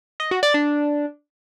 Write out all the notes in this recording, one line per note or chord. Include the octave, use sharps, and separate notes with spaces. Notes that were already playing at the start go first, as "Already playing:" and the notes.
D#5
F#4
D5
D4